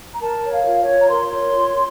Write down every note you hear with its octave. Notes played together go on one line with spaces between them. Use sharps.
A#5
A#4 A5
C#5
F5
F4
C#5
F4
A#5
A#4 C6
C#5
F4